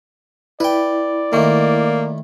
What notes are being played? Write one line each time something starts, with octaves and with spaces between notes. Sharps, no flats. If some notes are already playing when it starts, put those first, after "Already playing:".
E4 B4 D5 G5
A2 D#3 A#3